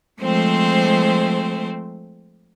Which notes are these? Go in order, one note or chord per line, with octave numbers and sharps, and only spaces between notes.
F3 G#3 A3 C4 C5